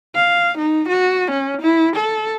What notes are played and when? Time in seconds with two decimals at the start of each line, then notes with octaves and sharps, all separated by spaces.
0.15 F5
0.58 D#4
0.88 F#4
1.31 C#4
1.61 E4
1.96 A4